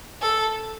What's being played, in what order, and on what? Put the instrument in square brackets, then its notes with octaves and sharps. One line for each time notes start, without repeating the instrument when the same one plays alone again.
[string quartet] A4